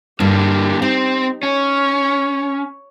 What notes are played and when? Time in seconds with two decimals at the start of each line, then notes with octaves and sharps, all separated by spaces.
0.20 G2 D3 A#3 G4
0.82 C4 D#4
1.43 C#4 C#5